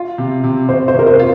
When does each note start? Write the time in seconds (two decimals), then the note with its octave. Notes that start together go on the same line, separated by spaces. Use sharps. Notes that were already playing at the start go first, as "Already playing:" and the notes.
Already playing: F4
0.18 C3
0.44 C3
0.69 C3 C5
0.88 C5
0.94 C3 A#4
1.07 C5
1.19 F4